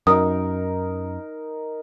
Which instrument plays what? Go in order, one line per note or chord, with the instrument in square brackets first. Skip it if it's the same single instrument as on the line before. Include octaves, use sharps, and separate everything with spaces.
[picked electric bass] F#2 [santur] D#4 A#4 [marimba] D#6